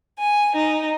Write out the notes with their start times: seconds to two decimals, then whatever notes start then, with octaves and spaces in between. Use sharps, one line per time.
0.19 G#5
0.55 D#4